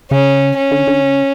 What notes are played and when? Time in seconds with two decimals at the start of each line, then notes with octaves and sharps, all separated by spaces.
0.11 C#3 C#4
0.57 C#4
0.71 D3
0.87 D3
1.02 C#3